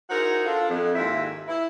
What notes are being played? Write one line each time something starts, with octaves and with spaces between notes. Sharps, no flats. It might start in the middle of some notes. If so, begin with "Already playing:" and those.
D#4 E4 F#4 G#4 A#4 C5
D4 F4 A4
F2
D#2 G#2 E4 F4 E5
E4